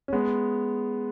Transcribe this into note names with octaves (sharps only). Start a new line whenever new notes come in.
C#4
G#3 B3